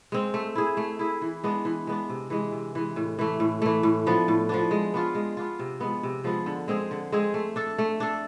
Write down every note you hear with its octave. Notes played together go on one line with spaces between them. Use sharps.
G#3 C4
A3
E4 G#4
A3
E4 G#4
E3
G#3 B3 D4
E3
G#3 B3 D4
C3
E3 G#3
C3
E3 G#3
A2
E3 A3
A2
E3 A3
A2
F3 B3 D4
A2
F3 B3 D4
G#3
B3 D4 F4
G#3
B3 D4 F4
C3
F3 G#3 B3
C3
F3 G#3 B3
D3
G#3 C4 G#4
D3
G#3 C4 G#4
A3
D4 A4
A3
D4 A4